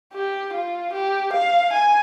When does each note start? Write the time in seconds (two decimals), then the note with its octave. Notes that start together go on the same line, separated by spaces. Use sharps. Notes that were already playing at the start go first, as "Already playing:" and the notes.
0.14 G4
0.53 F4
0.93 G4
1.33 F5
1.73 G#5